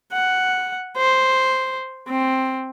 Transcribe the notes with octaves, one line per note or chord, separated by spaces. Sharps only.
F#5
C5
C4